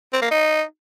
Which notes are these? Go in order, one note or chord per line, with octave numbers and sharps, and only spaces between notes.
C4
A#3
D#4